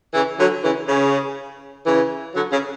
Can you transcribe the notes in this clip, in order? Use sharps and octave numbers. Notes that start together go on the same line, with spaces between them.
C#3 E3
D3 F#3
C#3 E3
C#3
C#3 E3
D3 F#3
C#3